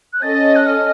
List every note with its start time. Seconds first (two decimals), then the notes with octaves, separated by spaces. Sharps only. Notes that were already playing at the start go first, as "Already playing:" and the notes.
0.13 F#6
0.22 C#4 A4 D#5 A6
0.56 F#6
0.66 F6